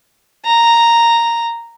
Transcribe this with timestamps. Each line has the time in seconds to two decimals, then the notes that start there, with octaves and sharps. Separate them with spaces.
0.45 A#5